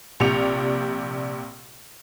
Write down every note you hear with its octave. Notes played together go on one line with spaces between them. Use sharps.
A#1 C3 G4 D5 C#7 F7